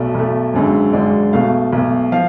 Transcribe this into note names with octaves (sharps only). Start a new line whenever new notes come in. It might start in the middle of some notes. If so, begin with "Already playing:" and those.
Already playing: B1 B2 A3 D5
B1 B2 A3
G#1 F#2 D3 G#3
G#1 F#2 D3 G#3 D5
B1 B2 A3 F5
B1 B2 A3
F3 F5